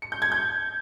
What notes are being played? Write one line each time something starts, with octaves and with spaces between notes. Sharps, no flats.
C#7
G6
G#6
G6